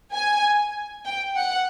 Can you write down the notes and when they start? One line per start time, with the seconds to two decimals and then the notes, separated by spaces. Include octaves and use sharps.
0.12 G#5
1.05 G5
1.36 F#5